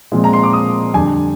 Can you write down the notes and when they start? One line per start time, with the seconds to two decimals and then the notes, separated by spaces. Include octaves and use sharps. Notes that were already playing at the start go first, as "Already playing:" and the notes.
0.12 A#2 F3 G#3 C4 F4
0.24 A#5
0.33 C6
0.43 D6
0.53 D#6
0.93 F2 D3 G3 D4 G4 G#5